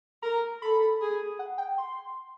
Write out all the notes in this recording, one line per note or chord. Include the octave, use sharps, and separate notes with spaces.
A#4 A#5
A4 B5
G#4
F#5
G5
C6